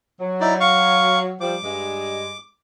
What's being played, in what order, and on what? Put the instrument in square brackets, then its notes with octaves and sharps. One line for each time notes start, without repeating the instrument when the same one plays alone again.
[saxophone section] F#3
[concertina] D#4 E4 D5
F5 C#6
[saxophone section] F3 G3 [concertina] D6
[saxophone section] G2 G#3